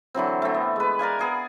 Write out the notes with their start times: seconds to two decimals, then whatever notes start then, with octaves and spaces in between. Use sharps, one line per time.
0.14 D3 E3 F#3 C4
0.42 A3 C4
0.54 B3
0.76 G#3 B4
0.99 A#4 D5 F5 G#5
1.19 B3 G#4 D6